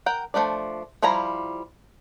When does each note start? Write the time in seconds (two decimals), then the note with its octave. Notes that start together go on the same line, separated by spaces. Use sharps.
0.06 A#4 F#5 G5
0.34 F3 A3 D4 D5
1.03 F3 G3 E4 F5 A#5